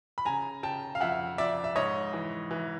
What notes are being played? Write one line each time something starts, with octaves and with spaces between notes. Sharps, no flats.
B5
C#3 G#5 A#5
C#3 G5 A5
F5
F2 E5 F#5
F2 D5 E5
E5
G#2 C#5 D#5
E3
E3